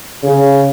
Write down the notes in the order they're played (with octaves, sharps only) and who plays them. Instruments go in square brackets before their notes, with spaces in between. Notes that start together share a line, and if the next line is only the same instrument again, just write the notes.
[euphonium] C#3